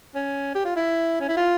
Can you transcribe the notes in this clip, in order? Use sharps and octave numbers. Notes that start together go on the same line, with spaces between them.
C#4
G4
F4
E4
C#4
E4
F4